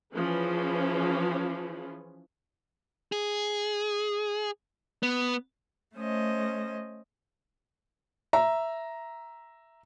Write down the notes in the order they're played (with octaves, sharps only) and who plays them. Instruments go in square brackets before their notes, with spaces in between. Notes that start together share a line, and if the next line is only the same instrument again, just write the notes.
[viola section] E3 F3 C#4 G#4 B4
[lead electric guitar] G#4
B3
[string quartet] A3 C#4 C5 D#5
[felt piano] E5 A#5